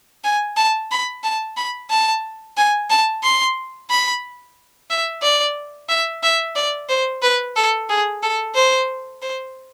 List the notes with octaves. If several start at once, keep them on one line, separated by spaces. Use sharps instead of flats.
G#5
A5
B5
A5
B5
A5
G#5
A5
C6
B5
E5
D5
E5
E5
D5
C5
B4
A4
G#4
A4
C5
C5